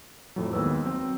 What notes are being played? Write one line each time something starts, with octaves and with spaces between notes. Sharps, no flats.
F2 A2 F#3
D#2 G#3 B3 B4 E6
F#3 C4